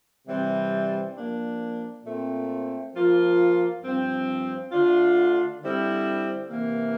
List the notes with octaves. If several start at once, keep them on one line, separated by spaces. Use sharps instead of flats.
C3 E3 G3 C4
F3 A#3 D4
A#2 A3 C4
F3 A#3 F4
G2 F3 C4
D3 A3 D4 F4
D3 G3 C4 E4
C3 E3 A#3